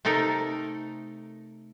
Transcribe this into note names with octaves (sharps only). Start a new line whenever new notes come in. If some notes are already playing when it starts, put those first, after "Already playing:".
C3 A3 D#4 A4 A#4